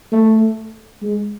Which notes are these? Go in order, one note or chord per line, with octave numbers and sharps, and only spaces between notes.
A3
G#3